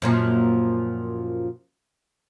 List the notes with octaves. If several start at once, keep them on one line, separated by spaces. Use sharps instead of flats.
F#2 A#2 F3